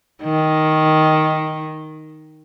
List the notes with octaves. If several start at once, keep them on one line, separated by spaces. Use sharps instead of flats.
D#3